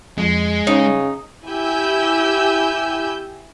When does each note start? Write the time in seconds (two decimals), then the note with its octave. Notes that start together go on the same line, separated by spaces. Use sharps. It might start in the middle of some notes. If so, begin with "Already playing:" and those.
0.18 F2 G#3
0.67 C#3 C#4 D#4
1.47 E4 G4 G#5 E6 G6